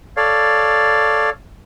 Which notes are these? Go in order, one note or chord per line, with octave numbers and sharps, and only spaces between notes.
A4 C#5 D5 F5